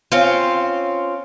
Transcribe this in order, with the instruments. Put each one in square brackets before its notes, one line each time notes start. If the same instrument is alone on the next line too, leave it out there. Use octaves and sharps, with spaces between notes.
[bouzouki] C4 C#4 F4